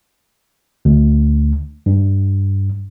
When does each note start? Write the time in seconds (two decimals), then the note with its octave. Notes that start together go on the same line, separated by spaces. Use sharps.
0.85 D2
1.86 G2